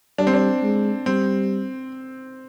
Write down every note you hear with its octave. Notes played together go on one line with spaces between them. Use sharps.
G3 D4
C4
D4
G#3
G3 C4